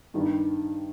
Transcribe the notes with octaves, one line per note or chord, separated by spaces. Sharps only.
G2 D#3 G3